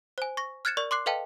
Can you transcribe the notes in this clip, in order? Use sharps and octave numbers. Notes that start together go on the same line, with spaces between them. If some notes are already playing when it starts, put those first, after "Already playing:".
C5 G#5
C#6 A#6
F6 F#6 G#6 A6 C#7 E7
A#4 D5 C#6
C6 D6 F#6 C7
A4 B4 D#5 F5 G5 A5